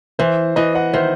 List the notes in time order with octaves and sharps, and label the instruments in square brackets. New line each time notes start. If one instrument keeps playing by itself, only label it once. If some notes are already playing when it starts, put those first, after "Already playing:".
[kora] E3 [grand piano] C5 E5
[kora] E3 [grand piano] B4 D#5
[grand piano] D#5 F#5
[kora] D#3 [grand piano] C5 E5